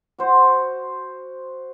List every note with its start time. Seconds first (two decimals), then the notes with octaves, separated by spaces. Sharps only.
0.18 F#4 C5